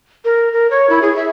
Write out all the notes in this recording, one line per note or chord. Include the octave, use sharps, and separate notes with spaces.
A#4
A#4
C#5
E4
G#4
E5